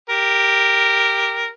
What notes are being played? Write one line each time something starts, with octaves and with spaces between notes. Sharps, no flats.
G4 A#4